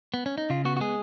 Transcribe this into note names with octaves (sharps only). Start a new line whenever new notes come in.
B3
C#4
D#4
C#3 F4
B3 F#4
F#4
G#3 G#4